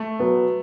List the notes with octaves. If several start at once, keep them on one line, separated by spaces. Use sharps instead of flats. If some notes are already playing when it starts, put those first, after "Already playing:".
Already playing: A3
F#3 B3